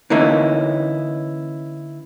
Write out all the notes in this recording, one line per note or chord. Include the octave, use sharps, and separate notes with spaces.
D3 E3 A#3 C#4 D#4 E4